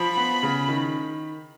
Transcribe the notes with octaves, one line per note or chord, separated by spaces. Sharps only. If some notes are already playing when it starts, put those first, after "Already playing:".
Already playing: F3 B5
B3
C#3
D#3